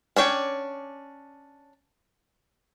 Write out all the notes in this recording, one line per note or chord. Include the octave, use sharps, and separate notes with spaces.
C#4 D4 C#5 G5